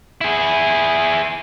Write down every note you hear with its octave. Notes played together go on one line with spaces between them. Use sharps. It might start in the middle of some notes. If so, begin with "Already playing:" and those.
E4 G#4